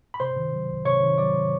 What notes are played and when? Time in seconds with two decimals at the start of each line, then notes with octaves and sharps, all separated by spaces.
0.14 B5
0.20 C3 C5 C6
0.36 D#3
0.53 F#3
0.69 C2
0.85 C3 C#5 C#6
1.02 D#3
1.18 F#3 D5 D6